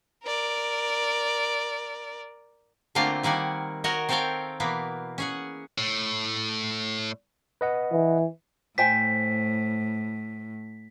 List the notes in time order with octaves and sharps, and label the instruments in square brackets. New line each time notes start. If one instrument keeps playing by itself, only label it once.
[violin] A#4 D5
[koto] D3 A3 A#3 C4 F4 F5
D#3 G3 A#3 F#5 G#5
F#4 A#4 C#5 D#5 F#5
C4 A4 A#4 C#5 F5 G5
B2 E3 A#3 B3
C#4 G#4 F#5
[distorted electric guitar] A2
[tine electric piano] B4 D#5 F#5
[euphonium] E3
[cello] A2 [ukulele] C5 G5 G#5 [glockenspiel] B6